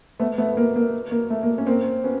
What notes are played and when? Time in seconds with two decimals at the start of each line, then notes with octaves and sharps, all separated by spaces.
0.20 A3 B3
0.38 A3 B3
0.57 A#3
0.76 A#3
1.11 A#3
1.30 A3
1.43 A#3
1.58 C#4
1.67 A#3 C4
2.04 B3 C#4